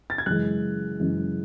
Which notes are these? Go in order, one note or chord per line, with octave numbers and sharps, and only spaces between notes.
A6
G#6
F#2 C#3 E3 G#3 F#6
F#2 C#3 E3 G#3